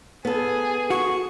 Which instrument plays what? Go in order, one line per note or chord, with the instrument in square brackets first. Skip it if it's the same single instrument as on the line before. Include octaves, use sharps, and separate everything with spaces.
[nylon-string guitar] B3 A4 [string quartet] G#4
[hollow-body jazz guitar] F#4 [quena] C#6